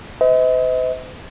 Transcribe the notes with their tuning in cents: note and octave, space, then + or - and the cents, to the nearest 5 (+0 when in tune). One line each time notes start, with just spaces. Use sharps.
C5 -45 D#5 +40